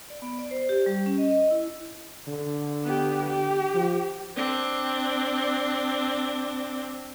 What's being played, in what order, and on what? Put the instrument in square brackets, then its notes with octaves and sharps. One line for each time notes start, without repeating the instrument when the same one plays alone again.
[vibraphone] D5
B3
D5
C5
G4
G3
C#4
D#5
D#5
E4
[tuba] D3
[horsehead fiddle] B3 G4
G4
[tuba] F3
[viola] C4 D4